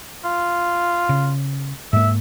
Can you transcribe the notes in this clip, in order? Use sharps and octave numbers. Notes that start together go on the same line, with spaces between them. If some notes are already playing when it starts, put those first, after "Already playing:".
F4
C#3
G#2 A#3 E5